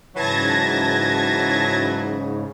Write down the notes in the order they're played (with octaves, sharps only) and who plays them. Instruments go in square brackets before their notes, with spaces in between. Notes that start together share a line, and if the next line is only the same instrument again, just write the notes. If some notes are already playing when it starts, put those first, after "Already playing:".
[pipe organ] G#2 C#3 [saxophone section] E3 F#3 [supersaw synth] A5 G#6 A#6